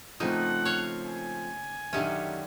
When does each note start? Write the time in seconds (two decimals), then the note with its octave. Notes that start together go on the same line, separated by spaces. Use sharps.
0.20 C#3 F3 A3 A#3 C4 D#4 F#5
0.65 C#5 F5
1.04 G#5
1.93 F#2 D3 D#3 C#4 G4 E5